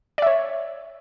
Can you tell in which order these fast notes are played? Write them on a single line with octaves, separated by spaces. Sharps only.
D5 E5 C#5